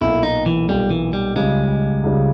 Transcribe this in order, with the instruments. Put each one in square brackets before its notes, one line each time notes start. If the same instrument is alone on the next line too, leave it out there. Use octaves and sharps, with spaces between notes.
[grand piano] B1 A#2 A#3 [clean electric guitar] E4
[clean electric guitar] D#4
E3
[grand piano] B1 A#2 A#3 [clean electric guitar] G3
[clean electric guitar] E3
G3
[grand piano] C#2 C#3 G3 [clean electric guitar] G#3
[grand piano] C#2 C#3 G3